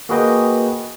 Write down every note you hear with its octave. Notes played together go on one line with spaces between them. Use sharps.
A#3 F#4 G#4 B4 D#5 G5